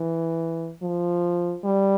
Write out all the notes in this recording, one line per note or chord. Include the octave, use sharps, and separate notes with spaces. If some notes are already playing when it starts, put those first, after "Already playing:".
Already playing: E3
F3
G3